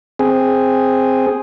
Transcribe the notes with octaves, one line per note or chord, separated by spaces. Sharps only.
C4 G#4